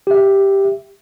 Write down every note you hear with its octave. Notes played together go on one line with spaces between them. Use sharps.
G4 E5